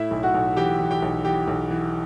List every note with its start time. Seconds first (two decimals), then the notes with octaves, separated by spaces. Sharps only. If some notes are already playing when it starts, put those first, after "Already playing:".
Already playing: A2 E4 E5
0.11 B1
0.23 F#4 F#5
0.35 B1
0.56 E3 G4 G5
0.80 E3
0.91 G4 G5
1.03 B1
1.25 E3 G4 G5
1.48 B1
1.70 E3